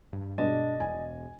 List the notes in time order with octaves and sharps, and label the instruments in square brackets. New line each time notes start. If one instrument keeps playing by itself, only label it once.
[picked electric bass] G2
[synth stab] G2 B2 G#3 [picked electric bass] D4 [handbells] D5 D#5
[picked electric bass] E1 [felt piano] G#5